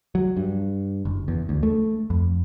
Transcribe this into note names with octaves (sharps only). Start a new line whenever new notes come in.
F#3
G2
F#1
E2
D2
A3
F2